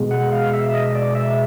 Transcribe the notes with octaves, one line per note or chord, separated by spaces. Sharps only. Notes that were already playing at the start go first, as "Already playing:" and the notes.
Already playing: B2 G#3
F#5
F5
E5
D#5
D5
E5